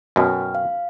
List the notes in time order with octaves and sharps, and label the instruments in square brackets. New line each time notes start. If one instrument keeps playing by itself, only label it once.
[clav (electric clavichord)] F#2 B2 [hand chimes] G5 F6
[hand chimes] F5